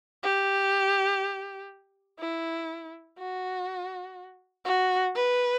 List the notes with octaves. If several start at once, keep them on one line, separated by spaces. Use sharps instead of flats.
G4
E4
F#4
F#4
B4